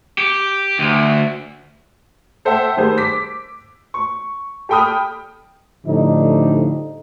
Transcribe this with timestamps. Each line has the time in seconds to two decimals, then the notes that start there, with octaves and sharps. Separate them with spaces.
0.18 G4
0.79 D2
2.45 A4 C5 E5 F#5 G5 E6
2.77 D#3 G3 A3 G#4 C5
2.98 D6 B6
3.94 C#6
4.69 G4 A4 G5 B5 D#6 F6
5.86 A2 D3 F3 G3 D4 D#4